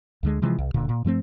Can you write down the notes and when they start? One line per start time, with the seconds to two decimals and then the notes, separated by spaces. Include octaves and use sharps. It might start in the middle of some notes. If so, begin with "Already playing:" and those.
0.23 D2 D3 G#3
0.42 C3 E3 F3 G#3
0.58 C2
0.74 D1 A#2 D3
0.89 A#2
1.05 G2 F3 A3 C4